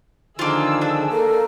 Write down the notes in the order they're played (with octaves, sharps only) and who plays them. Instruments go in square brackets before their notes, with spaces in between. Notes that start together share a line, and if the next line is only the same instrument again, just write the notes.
[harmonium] D3 D#3 F3 [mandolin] A#3 F4 [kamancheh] G#4 E6
[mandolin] D4
[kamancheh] A#3 A#4 [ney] A4